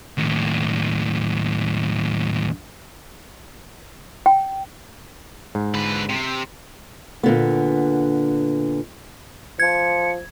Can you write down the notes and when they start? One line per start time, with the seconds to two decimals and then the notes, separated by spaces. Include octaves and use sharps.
0.18 D#2 A2
4.26 G5
5.55 G#2
5.74 D3 B4
6.09 C3
7.23 A#2 D3 B3
9.60 F3 G#6 C#7